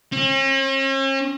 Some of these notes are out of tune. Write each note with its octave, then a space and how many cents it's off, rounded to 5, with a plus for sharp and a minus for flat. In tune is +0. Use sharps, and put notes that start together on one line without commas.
C#4 -45